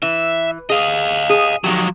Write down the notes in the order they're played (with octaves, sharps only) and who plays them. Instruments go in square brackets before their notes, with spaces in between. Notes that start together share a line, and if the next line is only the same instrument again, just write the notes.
[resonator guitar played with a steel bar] E3 [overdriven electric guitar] E5
[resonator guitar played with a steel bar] G#4 [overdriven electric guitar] D#5 F5
[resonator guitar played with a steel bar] G#4
[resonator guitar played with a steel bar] D#3 G#3 G4 [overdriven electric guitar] F3 F#3